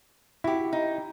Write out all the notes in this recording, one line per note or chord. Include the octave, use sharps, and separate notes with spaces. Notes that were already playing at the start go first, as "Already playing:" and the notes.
E4 F#4 G4
D#4